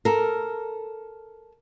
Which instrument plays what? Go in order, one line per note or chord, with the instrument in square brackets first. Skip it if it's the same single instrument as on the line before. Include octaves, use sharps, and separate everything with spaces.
[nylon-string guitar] A4 A#4